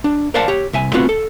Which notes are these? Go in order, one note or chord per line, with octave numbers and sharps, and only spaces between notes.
D4
A#4 C5 D5 F5 F#5 A5
G4 C#5
C2 E5 G#5
A3 B3 C4 F4 F#4 B4
A4